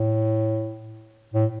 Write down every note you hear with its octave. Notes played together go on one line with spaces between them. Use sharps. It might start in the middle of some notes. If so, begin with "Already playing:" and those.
Already playing: A2
A2